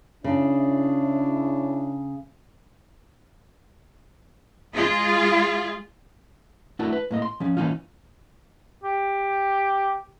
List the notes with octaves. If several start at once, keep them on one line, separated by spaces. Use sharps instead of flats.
C#3 D4 E4 G#4 C#5
G#3 F4 G#4
A3 D4 E4 F#4 A#4 A5
B4
A2 A#3 D#5
C6
F3 C#4
E3 F3 A#3 C#4 D#4 F4
G4